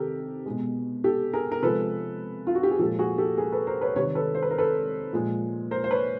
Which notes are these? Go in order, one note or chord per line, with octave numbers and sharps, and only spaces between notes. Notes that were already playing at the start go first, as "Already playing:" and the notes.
Already playing: C3 D#3 G4 A4 A#4
B2 G#3
G4 A4
G#4 A#4
A#4
C3 F3 G#3 A4 B4
F4
F#4
G4
G#4
A#2 F3 G#3 G4 A4
F#4 G#4
G4 A4
G#4 A#4
A4 B4
A#4 C5
B4 C#5
C3 D#3 G3 B4 C#5
A4 B4
C5
B4
A#4
A4 B4
A#2 F3 G#3
A#4 C5
C5
B4 C#5